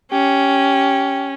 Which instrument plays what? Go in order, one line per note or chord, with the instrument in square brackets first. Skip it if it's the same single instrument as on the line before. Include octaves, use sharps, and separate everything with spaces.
[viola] C#4 [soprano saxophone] G4